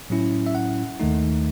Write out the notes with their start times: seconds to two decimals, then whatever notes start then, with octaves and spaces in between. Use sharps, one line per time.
0.10 A2 F#3 C#4 E4
0.46 E5
0.55 F#5
1.00 D#2 D#3 A3 D#4